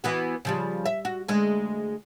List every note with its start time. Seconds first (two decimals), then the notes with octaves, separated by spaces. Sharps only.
0.04 E3 B3 F#4
0.45 C#3 F3 G3
0.86 E5
1.05 F#4
1.28 D2 G#3